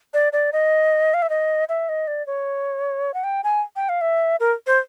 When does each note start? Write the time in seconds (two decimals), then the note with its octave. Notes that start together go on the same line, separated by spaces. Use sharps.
0.14 D5
0.33 D5
0.53 D#5
1.14 F5
1.22 E5
1.30 D#5
1.69 E5
1.89 D#5
2.07 D5
2.27 C#5
3.14 F#5
3.24 G5
3.44 G#5
3.76 G5
3.89 F5
4.01 E5
4.40 A#4
4.67 C5